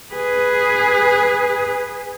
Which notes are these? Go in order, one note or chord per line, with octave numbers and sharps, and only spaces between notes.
G#4 B4